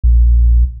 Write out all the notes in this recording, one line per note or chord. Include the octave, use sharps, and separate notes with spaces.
A#1